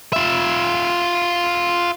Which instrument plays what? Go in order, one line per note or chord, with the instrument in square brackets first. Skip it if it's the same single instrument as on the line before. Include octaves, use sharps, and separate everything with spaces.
[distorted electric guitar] F4 E5